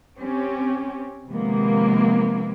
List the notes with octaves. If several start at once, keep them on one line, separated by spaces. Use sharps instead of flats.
C4 C#4 G4
C3 D#3 F3 G#3 A#3 B3